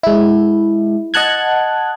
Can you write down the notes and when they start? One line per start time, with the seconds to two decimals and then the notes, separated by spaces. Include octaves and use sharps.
0.03 G#3 E4
1.14 D#5 F#5 A5 F#6 G#6